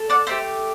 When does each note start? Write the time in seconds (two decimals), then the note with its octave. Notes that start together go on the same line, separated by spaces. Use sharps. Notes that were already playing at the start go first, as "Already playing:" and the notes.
Already playing: A4
0.10 D5 F#5
0.27 A3 E4 G4 C5 E5